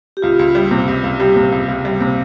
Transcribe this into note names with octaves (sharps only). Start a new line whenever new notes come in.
G4
C#2 F4
C#2
G3
C3
C#2
C#2
G3 G4
C3
C#2
C#2
G3
C3